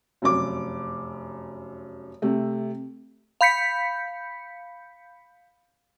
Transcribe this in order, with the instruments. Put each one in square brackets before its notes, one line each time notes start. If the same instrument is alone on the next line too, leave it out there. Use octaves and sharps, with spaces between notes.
[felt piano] F1 F#2 D6
C3 A3
[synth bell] F5 B5 G6 B6 C#7